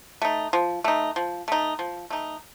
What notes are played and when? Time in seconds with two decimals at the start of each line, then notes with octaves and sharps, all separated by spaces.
0.22 A3 D#4
0.53 F3
0.84 A3 D#4
1.16 F3
1.48 A3 D#4
1.79 F3
2.10 A3 D#4